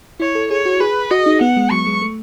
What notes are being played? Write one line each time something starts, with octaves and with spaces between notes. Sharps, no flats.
E4 C#5
A4
G#4 C#5
F#4
G#4 B4
F#4 D#5
D#4
B3 F#5
G#3
F#3 C#6
G#3
A3